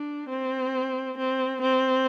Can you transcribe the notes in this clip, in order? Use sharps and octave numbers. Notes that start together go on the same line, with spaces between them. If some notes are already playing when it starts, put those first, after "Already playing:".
Already playing: D4
C4
C4
C4